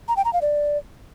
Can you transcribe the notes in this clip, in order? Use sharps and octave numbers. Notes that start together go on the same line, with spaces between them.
A#5
G5
A#5
F5
D5